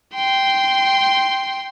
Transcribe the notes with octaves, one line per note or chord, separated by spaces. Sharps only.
G5 C6